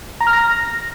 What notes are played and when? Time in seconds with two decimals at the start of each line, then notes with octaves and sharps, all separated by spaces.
0.20 A#5
0.27 F6
0.33 A#6